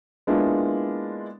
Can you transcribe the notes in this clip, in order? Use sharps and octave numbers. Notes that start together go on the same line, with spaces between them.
G#3 A#3 B3 D4 E4 F4